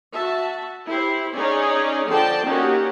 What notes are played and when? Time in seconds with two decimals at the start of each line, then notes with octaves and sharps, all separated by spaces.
0.13 F#4 E5 A5
0.89 E4 G4 C5
1.35 C#4 D#4 G#4 C#5 D5
2.08 D3 F3 D5 G5 A5
2.45 A#3 C#4 D#4 F#4 G4